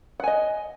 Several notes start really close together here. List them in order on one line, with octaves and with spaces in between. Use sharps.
F#5 G#5 D#5